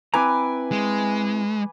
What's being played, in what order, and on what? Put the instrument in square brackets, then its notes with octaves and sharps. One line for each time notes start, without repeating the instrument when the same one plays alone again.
[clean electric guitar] C4 E4 A#5 [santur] B4 G#5 D6
[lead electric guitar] G#3